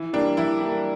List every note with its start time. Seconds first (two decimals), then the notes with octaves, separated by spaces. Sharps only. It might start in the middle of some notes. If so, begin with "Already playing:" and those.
Already playing: E3
0.13 G3 A#3 D4
0.37 E3 E4
0.60 G3 A#3